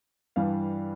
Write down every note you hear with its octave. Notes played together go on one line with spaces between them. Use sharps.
G2 E3 G3 F5